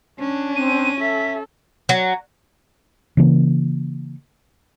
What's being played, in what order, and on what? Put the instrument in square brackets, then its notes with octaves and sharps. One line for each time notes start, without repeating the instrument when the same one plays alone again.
[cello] C#4 [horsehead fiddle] D4
[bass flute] C4 [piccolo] D#7
[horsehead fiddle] A4 [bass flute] E5 [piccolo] B6
[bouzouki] F#3
[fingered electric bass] C#3 E3 A#3